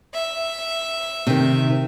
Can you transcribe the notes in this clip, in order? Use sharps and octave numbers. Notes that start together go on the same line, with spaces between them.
E5
C3 D#3